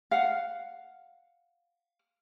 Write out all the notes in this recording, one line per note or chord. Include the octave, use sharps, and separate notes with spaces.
F5 F#5